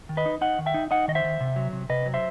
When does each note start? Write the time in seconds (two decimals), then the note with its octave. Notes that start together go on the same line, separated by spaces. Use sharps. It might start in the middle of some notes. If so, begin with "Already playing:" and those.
0.09 D#3
0.17 B4 D#5
0.26 D#4
0.41 D#4 D#5 F#5
0.59 D#3
0.66 E5 G5
0.74 D#4
0.91 D#4 D#5 F#5
1.08 D#3 D#5
1.15 C5 E5
1.24 D#3
1.40 C3
1.56 F#3
1.73 C3
1.89 C3 B4 D#5
2.06 F#3
2.14 C5 E5